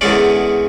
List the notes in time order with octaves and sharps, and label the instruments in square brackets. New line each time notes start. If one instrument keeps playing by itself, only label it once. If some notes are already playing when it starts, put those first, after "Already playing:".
[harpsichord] E2 D3 G#3 C#4 D5